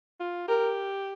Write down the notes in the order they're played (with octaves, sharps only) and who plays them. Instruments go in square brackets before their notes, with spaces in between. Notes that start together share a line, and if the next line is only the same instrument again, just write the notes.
[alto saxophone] F4
[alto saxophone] G4 [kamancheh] A#4